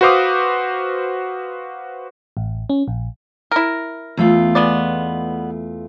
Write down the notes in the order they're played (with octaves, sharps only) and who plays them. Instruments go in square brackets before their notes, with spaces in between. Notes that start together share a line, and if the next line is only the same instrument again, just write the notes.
[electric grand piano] F#4 B4 C5 F5 D6 D#6
[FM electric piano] A1
C#4
A#1
[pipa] E4 A#4
[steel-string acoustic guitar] E2 A3 F4
[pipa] G#3 B3 D5